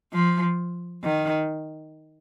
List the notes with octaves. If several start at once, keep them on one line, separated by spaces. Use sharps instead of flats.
F3
D#3